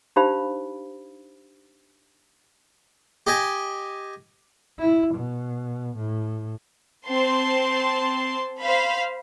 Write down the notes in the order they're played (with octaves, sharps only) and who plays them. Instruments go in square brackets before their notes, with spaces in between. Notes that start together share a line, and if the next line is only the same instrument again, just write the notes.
[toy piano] D4 D#4 G4 C5 F5 B5
[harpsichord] G4 D#5 G#5
[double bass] E4
B2
A2
[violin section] C4 A5 C6
C5 F5 B5